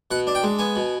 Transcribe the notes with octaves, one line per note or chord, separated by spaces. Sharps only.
B2 F#5
D4
G5
G#3
B3 G#5
B2